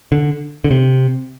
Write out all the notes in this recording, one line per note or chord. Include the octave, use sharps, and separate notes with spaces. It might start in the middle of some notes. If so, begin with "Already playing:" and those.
D3
D3
C3